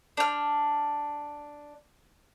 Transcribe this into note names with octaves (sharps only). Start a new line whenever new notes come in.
D4 F6